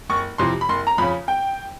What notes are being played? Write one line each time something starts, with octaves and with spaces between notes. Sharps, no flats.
F#1 C#6
F2 C3 E3 C6
B5
F#1 C6
A#5
F2 C#3 B5
G5